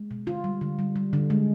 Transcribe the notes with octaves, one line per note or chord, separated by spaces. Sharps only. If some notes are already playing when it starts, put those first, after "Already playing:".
Already playing: G#3
B2
D3 F4
G3
D3
G3
G3
D3
G#3